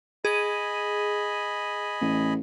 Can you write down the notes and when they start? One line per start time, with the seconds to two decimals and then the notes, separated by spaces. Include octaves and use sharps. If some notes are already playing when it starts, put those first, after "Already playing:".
0.25 G#4 D#5 G#5 B5 D#7
2.01 A1